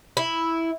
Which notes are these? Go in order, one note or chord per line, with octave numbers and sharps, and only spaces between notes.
E4